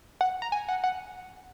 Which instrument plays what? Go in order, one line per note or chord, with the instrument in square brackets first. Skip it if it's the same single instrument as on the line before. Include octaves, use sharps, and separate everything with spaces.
[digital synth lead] F#5
A#5
G#5
F#5
F#5